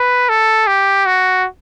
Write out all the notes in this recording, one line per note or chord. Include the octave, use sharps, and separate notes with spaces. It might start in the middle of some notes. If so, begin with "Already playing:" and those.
Already playing: B4
A4
G4
F#4